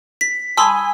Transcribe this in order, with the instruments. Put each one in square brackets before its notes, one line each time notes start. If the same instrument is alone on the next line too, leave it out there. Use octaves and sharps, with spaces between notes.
[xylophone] B6
[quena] G#5 [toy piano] A5 D#6 [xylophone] B5 C6 E6